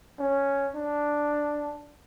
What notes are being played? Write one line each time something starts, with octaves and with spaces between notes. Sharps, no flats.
C#4
D4